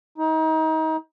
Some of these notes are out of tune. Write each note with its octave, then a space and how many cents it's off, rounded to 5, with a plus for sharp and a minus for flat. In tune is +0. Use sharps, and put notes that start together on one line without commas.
D#4 +30